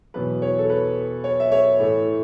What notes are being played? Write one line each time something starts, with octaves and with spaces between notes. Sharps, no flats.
E2 B2 F#3 B4
C#5
A4
B4
C#5
E5
C#5
A2 E3 A3